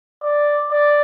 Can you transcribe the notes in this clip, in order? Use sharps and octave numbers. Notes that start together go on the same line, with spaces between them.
D5
D5